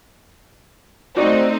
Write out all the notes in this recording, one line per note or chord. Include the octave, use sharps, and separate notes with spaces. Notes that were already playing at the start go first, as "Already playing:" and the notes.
A3 C4 D#4 F#4 D5